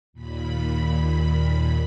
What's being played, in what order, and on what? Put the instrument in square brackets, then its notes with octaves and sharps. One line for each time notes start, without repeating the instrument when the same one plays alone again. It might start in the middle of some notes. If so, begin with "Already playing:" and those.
[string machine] D#2 A#2 B5